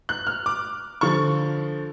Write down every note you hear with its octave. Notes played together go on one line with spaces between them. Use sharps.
F#6
F6
D6
D3 F3 C#6